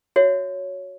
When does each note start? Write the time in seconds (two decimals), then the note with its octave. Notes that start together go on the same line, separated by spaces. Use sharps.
0.16 F#4 C#5 E5